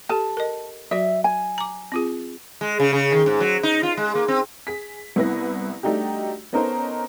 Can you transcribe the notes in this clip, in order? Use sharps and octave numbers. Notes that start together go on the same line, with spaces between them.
G4 A4 A5
A#4 D#5
F#3 F#4 D5 E5
G#5
A#5 D6
C4 F4 G#4
G#3
C#3
C#3
D#3
G#2
F#3
D#4
F4
G#3
A#3
C4
G#4 B6
C2 B3 E4 B4 A#6
G3 A3 D4 D#4 F#4 G4
B3 C#4 D#4 A4 A#4 C5